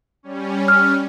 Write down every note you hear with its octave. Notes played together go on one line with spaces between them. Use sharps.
G3 C#4
F6